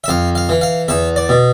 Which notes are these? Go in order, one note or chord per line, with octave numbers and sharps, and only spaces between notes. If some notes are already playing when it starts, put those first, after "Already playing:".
E5
F2 F5
F5
E3
F5
E2 E5
D5
B2